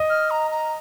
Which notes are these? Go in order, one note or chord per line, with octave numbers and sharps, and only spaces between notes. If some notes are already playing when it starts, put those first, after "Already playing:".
Already playing: D#5
F6
A#5
A#5